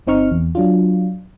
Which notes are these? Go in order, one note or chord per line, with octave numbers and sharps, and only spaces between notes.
G1 C4 D#4 C#6 F6
E2
F#3 D4 F4